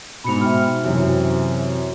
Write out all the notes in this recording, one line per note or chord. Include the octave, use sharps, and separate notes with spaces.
G#2 B2 B5 C#7 F7
E5 G5 F6
F#2 C3 E3